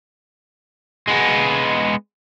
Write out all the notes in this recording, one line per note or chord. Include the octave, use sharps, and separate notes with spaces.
G#3 B3